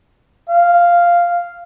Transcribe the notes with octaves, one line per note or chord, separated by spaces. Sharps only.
F5